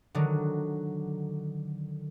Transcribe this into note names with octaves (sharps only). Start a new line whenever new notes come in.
D3 D#3 F#3